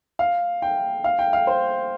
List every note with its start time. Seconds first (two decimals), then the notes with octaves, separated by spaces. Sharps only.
0.19 F5
0.62 G5
1.04 F5
1.19 G5
1.33 F5
1.47 C5